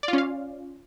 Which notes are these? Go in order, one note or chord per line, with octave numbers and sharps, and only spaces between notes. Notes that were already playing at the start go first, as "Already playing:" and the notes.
C#4 F4 D5 F5